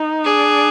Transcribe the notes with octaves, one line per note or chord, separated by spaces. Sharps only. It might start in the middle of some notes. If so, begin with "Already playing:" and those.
Already playing: D#4
D4 G#4